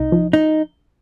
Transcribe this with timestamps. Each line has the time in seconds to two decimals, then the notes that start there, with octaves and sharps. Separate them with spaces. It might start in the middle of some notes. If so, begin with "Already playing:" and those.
Already playing: C2 D#4
0.12 F3
0.33 D#4